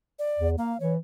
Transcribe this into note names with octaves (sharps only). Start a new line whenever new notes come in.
D5
E2
A#3 F5
E3 C#5